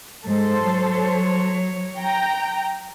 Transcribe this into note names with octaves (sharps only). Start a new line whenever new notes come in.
G#2 G#3 A4 C5
F#3 C#5
G5 A#5